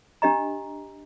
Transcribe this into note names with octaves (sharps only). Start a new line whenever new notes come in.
D4 G4 D#5 A#5